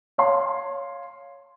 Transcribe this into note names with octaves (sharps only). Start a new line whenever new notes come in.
C#5 F5 C6